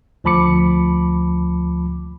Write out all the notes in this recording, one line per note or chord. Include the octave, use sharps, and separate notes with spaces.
D2 F3 A5 B5 D6 C#7